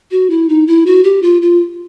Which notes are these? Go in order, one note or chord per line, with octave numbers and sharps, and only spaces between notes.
F#4
E4
D#4
E4
F#4
G4
F4
F4